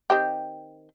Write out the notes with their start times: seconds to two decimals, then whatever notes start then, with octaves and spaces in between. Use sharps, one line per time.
0.10 D#3 C4 G4